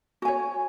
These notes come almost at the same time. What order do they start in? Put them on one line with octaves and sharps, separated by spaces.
F#4 G#5 C#5